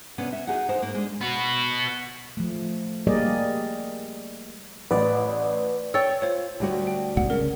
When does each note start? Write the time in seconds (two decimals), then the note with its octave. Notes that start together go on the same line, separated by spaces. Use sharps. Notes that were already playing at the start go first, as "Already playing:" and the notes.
0.18 C3 B3 C#4 D4
0.33 E5
0.47 D#4 F#4 G#4 A#4 F#5
0.69 D#4 A#4 C5
0.82 G#2 A#3
0.94 G#3 D4
1.21 B3 F#4
2.37 F3 A3
3.07 G3 A#3 G#4 A#4 D5 D#5
4.91 A1 B4 D5
5.94 C#5 G5 E6 A6
6.22 F4 C5 C#5
6.60 D2 G3 F#4
6.87 G5
7.17 C2 G#2 B2 F#5
7.30 C#3 A#4